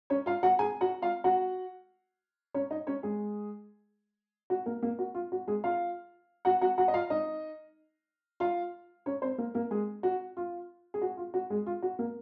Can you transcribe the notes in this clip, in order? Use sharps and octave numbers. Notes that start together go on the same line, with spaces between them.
C#4 C#5
F4 F5
F#4 F#5
G#4 G#5
F#4 F#5
F4 F5
F#4 F#5
C#4 C#5
D#4 D#5
C#4 C#5
G#3 G#4
F#4
A#3 A#4
A#3 A#4
F#4
F4
F#4
G#3 G#4
F4 F5
F#4 F#5
F#4 F#5
F#4 F#5
D#5
F4 F5
D#4 D#5
F4 F5
C#4 C#5
C4 C5
A#3 A#4
A#3 A#4
G#3 G#4
F#4
F4
G#4
F#4
F4
F#4
G#3 G#4
F4
F#4
A#3 A#4